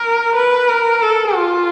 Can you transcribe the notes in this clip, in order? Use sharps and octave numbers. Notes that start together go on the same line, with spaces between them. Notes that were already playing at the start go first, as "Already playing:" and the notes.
Already playing: A#4
B4
A#4
A4
F4